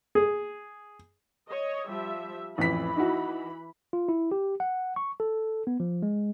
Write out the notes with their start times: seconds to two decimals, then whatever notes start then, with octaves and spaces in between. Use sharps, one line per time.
0.15 G#4
1.49 C#5 D#5
1.89 F3 G3 E5
2.58 A1 F2 E3 B5 B6
2.96 D#4 E4 F#4
3.93 F4
4.09 E4
4.32 G4
4.60 F#5
4.96 C#6
5.20 A4
5.67 B3
5.80 F3
6.03 G#3